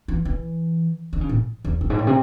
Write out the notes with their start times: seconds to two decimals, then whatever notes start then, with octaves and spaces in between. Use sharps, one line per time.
0.08 E3
0.25 E3
1.13 D#3
1.21 C#3
1.29 A2
1.65 E2
1.81 F#2
1.90 G#2
1.99 A2
2.07 C3